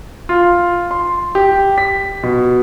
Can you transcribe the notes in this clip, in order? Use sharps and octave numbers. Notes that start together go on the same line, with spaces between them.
F4
C6
G4
B6
B2